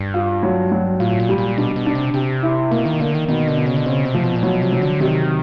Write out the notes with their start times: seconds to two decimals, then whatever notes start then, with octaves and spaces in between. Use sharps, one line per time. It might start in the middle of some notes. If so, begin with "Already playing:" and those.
Already playing: G2
0.14 F4
0.43 F#3
0.72 F#3
1.00 A2 F4
1.20 A#2
1.29 G3
1.38 A#2
1.57 B2 D4
1.76 B2
1.86 D4
1.95 C3
2.14 C3 G4
2.43 E4
2.71 B2 A#3
2.85 D#3
3.00 D3 A#3
3.14 D#3
3.28 B2 D#3
3.48 D3
3.57 B2
3.66 C#3
3.77 D3
3.86 C#3 C4
4.05 C3
4.14 F3
4.24 B2
4.36 A#2
4.43 B2 F#3
4.62 C3
4.72 F#3
4.82 D3
5.00 C3 D#3